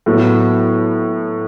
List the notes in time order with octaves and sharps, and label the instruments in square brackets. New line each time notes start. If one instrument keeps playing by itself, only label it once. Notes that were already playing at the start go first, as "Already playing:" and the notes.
[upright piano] A2 F#3 B3